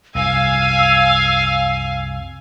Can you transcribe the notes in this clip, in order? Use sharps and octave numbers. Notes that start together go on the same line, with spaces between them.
C2 F#2 C3 F5 G#5 E6